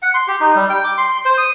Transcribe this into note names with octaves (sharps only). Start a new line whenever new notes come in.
F#5
C6
G4
D#4
G3
G5
D6
C6
C5
D#6